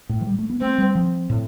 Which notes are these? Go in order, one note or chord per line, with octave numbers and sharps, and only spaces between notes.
A2
F3
G3
A3
B3
A3 C4
G3
F3
A2